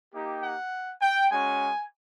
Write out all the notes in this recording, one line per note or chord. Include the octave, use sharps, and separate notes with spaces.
A#3 D#4 G4
F#5
G5
G#3 C#4 F#4 G#5